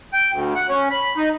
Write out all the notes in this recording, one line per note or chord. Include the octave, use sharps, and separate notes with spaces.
G5
D2
F#5
C#4
B5
D#4